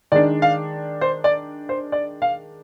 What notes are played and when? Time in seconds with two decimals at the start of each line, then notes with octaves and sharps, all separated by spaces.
0.12 D#3 G#3 D4 D5
0.42 F5
1.01 C5
1.24 D5
1.69 C5
1.92 D5
2.22 F5